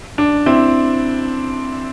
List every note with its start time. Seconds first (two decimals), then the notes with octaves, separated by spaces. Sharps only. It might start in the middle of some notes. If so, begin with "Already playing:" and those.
0.18 D4
0.46 C4 E4